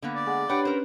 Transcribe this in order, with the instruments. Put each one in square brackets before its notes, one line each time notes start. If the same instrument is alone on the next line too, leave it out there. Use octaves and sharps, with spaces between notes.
[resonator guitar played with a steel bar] D3 A#3 B3
[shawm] D5
[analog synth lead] G#3 [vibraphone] F#5
[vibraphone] D4 G4 C#5 [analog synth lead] B4 [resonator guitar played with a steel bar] F#5 G5
[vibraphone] C#4 [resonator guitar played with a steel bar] A#4 C5